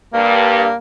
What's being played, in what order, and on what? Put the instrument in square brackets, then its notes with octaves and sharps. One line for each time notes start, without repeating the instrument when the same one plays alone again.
[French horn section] G2 [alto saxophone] A#3